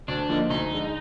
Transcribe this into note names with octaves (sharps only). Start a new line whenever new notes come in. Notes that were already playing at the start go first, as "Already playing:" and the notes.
D2 D4
D3 F3 A#3 D#4
D2 D#4
D3 G#3